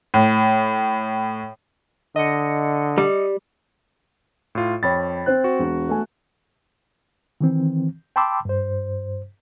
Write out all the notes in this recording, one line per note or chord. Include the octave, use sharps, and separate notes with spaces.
A2
D3 D#5 C#7
G3
A2 F4
F2 C#5 G5 B5 A6
C4 C5 F#6
F#4
E1
A3 G#5
D#3 E3 C4
G5 A5 B5 C6 D6 E6
G2 C5